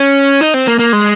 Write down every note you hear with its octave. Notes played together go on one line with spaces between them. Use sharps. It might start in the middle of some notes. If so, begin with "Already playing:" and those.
Already playing: C#4
D#4
C4
A#3
A#3
G#3